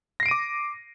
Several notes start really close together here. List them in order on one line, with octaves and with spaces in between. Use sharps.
A#6 C7 D7 D#7 D6